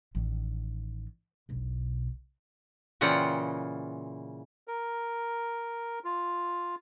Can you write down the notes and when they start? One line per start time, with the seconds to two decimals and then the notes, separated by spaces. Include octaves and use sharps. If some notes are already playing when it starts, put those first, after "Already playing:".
0.15 A1 D#3
1.49 E1 B1
3.01 A#2 C#3 E3 F4 F#5 G5
4.68 A#4
6.04 F4